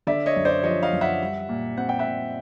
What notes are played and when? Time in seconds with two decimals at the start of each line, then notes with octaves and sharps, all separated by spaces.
0.07 D3 D5 E5
0.26 C#5 D#5
0.36 F#2
0.45 C5 D5
0.63 F3 C#5 D#5
0.83 D#5 F5
0.93 F#2
1.01 E5 F#5
1.21 G3
1.49 A#2
1.77 C4 F#5
1.89 G5
1.99 E5 F#5
2.06 A#2